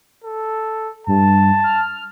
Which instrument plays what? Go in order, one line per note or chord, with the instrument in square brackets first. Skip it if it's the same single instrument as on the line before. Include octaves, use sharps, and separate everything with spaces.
[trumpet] A4
[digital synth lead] G2 [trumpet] A5
[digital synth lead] F6